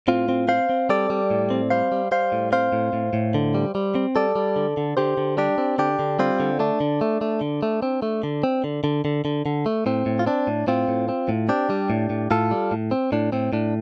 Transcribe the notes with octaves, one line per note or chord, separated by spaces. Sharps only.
A2 C4 F4
C4
C4 C5 F5
C4
G3 A4 D5
G3
A2
C4
G3 C5 F5
G3
G3 C5 F5
A2
C4 C5 F5
A2
A2
A2
D3
G3
G3
C4
G3 A4 D5
G3
D3
D3
D3 G4 C5
D3
G3 D4 G4
C4
D3 D4 G4
D3
G3 C4 F4
D3
A3 D4
D3
A3
A3
D3
A3
C4
A3
D3
C4
D3
D3
D3
D3
D3
A3
A2 C4
A2
F4
C4 D4
A2
A2 C4 F4
A2
C4
A2
C4 D4 G4
G3
A2
A2
A2 F4 A4
G3
A2
C4
A2 D4
A2 C4
A2 D4